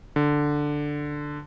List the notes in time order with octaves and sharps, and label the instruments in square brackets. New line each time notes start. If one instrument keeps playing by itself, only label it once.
[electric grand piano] D3